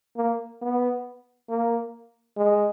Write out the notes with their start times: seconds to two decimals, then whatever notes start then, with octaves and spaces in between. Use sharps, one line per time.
0.17 A#3
0.62 B3
1.49 A#3
2.37 G#3